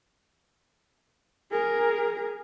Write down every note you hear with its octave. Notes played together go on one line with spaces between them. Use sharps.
G#4 A#4